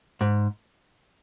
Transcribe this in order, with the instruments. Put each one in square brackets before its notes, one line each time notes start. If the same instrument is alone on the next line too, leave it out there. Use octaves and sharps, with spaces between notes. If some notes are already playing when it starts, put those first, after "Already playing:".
[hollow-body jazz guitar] G#2